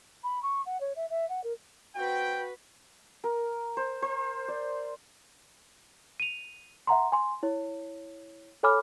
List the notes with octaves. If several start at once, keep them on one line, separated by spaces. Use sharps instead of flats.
B5
C#6
F#5
C#5
E5
E5
F#5
A#4
C4 F#4 B4 G5
A#4
C5
C5
D5
D#7 F7
E5 F#5 A#5 C6
G#5 C6
E4 C#5
A4 C#5 G#5 B5 D6 F6